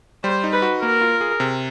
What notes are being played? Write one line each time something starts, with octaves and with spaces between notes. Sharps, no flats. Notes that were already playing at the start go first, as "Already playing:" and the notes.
G3 C5
D#4
B4
F#4
A#3 A#4
F4
G#4
C3